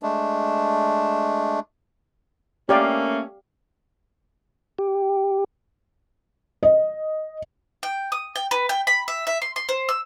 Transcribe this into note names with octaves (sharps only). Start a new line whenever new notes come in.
G#3 A3 D4
A3 A#3 C#4 G4 D5 F5
G4
D#5
G5
D#6
G5
B4
G5
B5
E5
E5
C6
C6
C5
E6